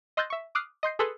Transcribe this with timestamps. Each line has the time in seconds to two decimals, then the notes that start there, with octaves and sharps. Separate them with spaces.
0.17 D#5 C6 E6 F#6 G6 A6
0.30 E5 C#6
0.55 D6 D#6 F6 F#6 C7
0.83 D#5 C6 G6 C7
0.99 G#4 A4 B4 C6